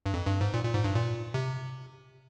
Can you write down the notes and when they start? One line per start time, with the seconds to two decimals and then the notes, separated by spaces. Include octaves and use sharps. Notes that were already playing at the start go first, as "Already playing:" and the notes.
0.06 G2
0.14 F2
0.27 G2
0.41 G#2
0.54 A#2
0.64 A#2
0.74 G#2
0.84 G2
0.94 A#2
1.34 C3